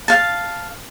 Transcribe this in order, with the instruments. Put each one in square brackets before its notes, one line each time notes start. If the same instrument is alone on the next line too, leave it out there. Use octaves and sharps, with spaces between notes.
[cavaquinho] F5 A5